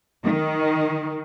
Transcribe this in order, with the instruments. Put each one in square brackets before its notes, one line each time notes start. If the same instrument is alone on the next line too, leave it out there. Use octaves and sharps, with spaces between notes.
[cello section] D#3